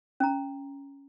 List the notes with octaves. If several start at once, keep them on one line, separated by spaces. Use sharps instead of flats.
C#4 A#5